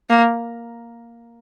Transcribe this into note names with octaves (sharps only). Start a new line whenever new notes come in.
A#3